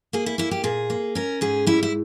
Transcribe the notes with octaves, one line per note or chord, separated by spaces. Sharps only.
A#3 G#4
E4
A#3 E4
G4
A#2 G#4
A#3
C#4 A#4
G#2 G#4
G3 E4
E4